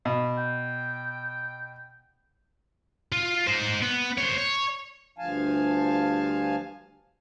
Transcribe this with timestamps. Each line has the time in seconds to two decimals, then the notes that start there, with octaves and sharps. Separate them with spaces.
0.05 B2
0.38 G5
3.12 F4
3.47 D#4 C5
3.83 B3
4.18 C5 C#5
4.38 C#5
5.18 D2 G2 F3 F5 G#5 A5